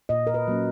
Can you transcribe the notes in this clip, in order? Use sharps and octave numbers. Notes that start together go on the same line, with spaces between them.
A#2 D#5
A#4
B4
F#3 A#3 C#4